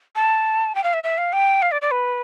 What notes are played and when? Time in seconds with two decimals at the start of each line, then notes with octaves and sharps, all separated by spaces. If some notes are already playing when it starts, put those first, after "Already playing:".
0.16 A5
0.75 G5
0.84 F5
0.93 E5
1.04 E5
1.18 F5
1.33 G5
1.62 F5
1.72 D5
1.82 D5
1.91 B4